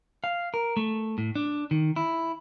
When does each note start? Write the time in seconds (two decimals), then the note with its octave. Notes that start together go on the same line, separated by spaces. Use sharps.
0.24 F5
0.54 A#4
0.77 A3
1.18 A2
1.36 D4
1.71 D#3
1.96 E4